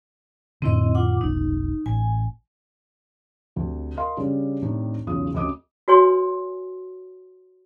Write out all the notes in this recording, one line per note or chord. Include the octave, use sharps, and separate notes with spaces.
F2 A2 D3 C4 E4 D#5
F4 F#5 D6
F1 B1 D#4
A1 G#5
D2 C3
A#4 D#5 F5 C6
C#3 G3 D4
A2 C3 D#3 D4 G4
B1 E2 C#3 F4 D#6
D2 C3 C#4 D#5 D6 D#6
F#4 B4 C#5 G#5 C6